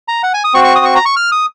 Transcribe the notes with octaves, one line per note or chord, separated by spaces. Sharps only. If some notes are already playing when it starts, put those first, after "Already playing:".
A#5
F#5
G#5
D#6
C4 F#4 C#6
C#6
D#6
C#6
A#5
C#6
F6
D#6